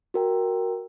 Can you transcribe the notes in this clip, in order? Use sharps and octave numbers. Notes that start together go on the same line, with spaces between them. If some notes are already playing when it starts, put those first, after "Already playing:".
F#4 A#4 G5